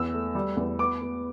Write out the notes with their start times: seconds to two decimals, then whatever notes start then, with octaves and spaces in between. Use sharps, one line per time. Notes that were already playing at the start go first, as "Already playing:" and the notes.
Already playing: E2 E6
0.13 A3
0.35 G3
0.57 E2
0.79 B3 D6
1.02 B3